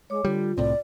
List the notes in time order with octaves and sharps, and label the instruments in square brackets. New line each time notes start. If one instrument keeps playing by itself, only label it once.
[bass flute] G#3 [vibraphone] C#5 D6
[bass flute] D3 [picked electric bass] G3 [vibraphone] F4
[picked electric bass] C2 A2 C3 [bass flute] D5